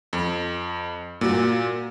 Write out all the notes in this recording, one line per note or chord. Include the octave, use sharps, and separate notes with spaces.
F2
A#2 A#3 F#4 A#4